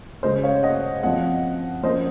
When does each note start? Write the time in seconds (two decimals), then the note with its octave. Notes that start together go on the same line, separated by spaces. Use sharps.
0.23 C#3 G#3 C#4 C5 D#5
0.43 C#5 F5
0.63 D#5 F#5
1.03 F3 C4 D#5 F#5
1.83 F3 A#3 C#4 C5 D#5